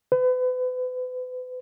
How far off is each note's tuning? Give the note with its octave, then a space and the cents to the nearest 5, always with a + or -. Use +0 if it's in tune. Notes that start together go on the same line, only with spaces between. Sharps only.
B4 +35